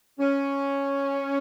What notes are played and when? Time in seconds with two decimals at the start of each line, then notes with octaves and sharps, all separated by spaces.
0.19 C#4